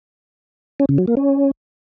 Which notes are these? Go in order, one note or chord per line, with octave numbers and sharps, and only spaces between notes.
C#4
C#3
F#3
A#3
C#4